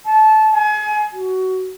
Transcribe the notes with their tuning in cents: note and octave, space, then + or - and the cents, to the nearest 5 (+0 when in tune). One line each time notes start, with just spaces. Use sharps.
A5 -20
G#5 +30
F#4 +20